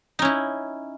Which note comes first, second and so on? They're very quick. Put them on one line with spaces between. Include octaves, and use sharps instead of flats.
D#4 C#4 E4